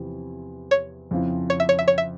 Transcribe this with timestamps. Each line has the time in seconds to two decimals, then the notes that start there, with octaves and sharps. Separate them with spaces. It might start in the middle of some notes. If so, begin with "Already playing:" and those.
Already playing: E2 C3 F3 C4 E4
0.71 C#5
1.11 F2 C#3 F3 C4 E4
1.50 C#5
1.60 E5
1.69 C#5
1.79 E5
1.88 C#5
1.98 E5